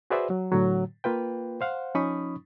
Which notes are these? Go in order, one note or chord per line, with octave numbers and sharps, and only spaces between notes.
F#4 G#4 B4 C5 D5 E5
F#3
A2 D3 F#3
A#3 F4 B4 G5
C5 F5 F#5
F3 C#4 D#4 B5 C#6 D#6